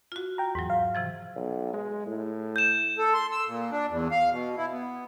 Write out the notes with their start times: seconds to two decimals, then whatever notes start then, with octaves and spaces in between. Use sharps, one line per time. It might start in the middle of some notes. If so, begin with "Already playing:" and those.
0.12 F4 F#4
0.38 G5 A#5
0.55 E2 G#2 F#3
0.70 F5
0.95 C3 E3 F3
1.36 B1
1.73 G#3
2.07 A2
2.56 G6 E7
2.97 A4
3.14 C6
3.32 E6
3.47 A#2
3.71 D4
3.89 E2
4.11 F5
4.31 B2
4.57 E4
4.71 B3